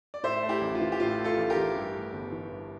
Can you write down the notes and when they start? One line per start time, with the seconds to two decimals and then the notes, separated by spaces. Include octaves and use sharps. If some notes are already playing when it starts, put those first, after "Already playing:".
0.14 D5
0.23 A2 C5 E5
0.43 A3
0.49 E4 G4
0.61 A1
0.75 F4
0.80 E3
0.92 G4
1.00 A2 F4
1.19 A3
1.24 F4 A4
1.37 A1
1.50 G4 A#4
1.56 E3
1.75 G2
1.94 A3
2.13 G1
2.32 E3
2.52 G2